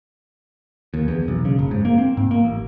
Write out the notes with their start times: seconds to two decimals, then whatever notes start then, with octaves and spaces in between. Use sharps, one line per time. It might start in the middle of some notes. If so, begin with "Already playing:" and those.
0.94 D#2
1.08 E2
1.28 B1
1.45 C#3
1.59 F#1
1.71 G#2
1.85 A#3
1.98 C4
2.17 G#2
2.31 A#3
2.45 A1